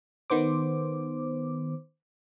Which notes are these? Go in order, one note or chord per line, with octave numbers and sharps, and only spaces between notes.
D#3 B3 C5 D6